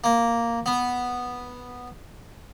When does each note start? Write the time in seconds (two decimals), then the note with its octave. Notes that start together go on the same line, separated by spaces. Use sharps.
0.04 A#3
0.66 B3